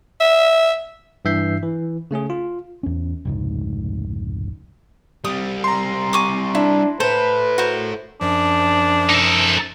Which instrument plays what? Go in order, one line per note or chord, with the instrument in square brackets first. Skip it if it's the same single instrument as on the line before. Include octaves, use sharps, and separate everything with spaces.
[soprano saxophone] E5
[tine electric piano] G2 E3 E5 G6 C7
E3
C#3 A3 C#4 G#4
F4
[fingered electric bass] E2 C#4
F1 C#2 G#2
[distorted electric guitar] G3 C4 [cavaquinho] D#6
[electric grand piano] A#5 C6
[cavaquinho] G#5 C#6 D6
[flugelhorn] D4 [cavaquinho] E4
[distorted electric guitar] E4 A4 [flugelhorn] B4 [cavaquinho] C5
[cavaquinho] F#4 A#4 C5
[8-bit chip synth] F#2 F3 [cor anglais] D4
[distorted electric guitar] D#4 A4